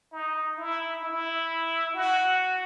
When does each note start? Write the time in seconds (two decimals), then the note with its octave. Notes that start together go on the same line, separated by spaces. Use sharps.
0.12 D#4
0.58 E4
1.03 E4
1.94 F#4